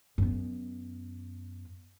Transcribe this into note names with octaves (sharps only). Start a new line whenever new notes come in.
F#2 B3